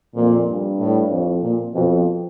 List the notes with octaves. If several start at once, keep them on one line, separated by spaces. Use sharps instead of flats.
F2 A#2
G2
A2
F2
A#2
F2 B2